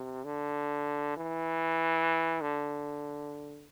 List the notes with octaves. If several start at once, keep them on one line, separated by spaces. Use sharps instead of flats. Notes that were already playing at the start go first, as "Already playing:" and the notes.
Already playing: C3
D3
E3
D3